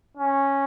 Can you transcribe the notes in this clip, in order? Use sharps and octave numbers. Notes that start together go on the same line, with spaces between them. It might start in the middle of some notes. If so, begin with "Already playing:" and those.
C#4